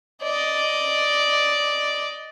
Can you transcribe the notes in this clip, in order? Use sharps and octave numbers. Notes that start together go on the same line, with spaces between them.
D5 D#5